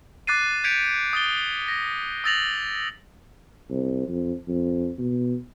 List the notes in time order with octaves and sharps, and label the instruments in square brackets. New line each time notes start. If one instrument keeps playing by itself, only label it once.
[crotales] D6 F#6 A6 C7 D#7
G6 G#6 B6 C#7 D7 F7
D#6 A6 G7
A#6
D#6 E6 A6 A#6 F7 F#7
[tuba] C2
F2
F2
B2